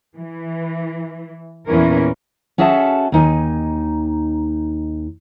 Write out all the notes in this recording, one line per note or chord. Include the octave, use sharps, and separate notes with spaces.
E3
E2 A#2 E3 C#4 A#4
C#4 F#4 G#4 A4 E5 A5
D#2 D#4 G#5